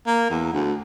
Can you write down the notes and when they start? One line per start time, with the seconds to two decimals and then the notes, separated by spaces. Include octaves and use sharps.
0.07 A#3
0.30 E2
0.53 D2